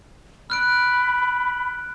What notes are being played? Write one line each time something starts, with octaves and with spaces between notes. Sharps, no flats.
B5 F6 F#6 D7